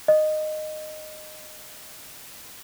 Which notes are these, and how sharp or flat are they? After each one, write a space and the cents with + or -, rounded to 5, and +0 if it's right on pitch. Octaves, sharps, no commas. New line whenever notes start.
D#5 -15